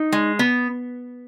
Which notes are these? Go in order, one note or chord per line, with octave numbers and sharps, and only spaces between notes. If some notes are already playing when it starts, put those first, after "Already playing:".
Already playing: D#4
G#3
B3